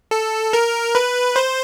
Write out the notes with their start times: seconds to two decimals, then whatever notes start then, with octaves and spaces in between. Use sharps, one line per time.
0.11 A4
0.53 A#4
0.95 B4
1.36 C5